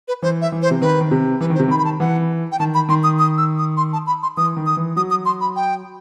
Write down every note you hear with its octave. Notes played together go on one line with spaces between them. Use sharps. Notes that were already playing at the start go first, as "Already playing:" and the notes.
B4
E3 C5
E5
E3
C5
C3
D#3 B4
D#3
C3
E3 B4
D#3
C5
C3
D#3 B5
B5
A5
E3 F#5
G5
D#3 A5
B5
D#3 C6
D#6
D#6
E6
D#6
C6
A5
B5
C6
E3 D#6
D#3
D#6
E3
F#3 D#6
D#6
C6
B5
G5